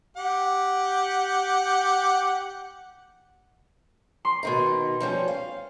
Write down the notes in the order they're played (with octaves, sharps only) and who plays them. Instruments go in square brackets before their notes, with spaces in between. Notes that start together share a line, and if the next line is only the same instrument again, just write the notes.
[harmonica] G4 F#5
[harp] C6
[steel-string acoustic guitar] B2 D#3 D#4
F3 G3 C#4
F5